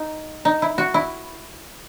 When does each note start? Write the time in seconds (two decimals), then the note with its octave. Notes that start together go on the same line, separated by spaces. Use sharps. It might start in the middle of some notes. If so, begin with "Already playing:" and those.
Already playing: D#4
0.45 D#4
0.62 E4
0.78 F#4
0.94 E4